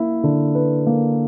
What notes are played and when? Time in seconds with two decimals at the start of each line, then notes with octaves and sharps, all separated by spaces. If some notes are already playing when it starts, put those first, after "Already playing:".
Already playing: A#3 E4
0.24 D3
0.55 B4
0.87 A#3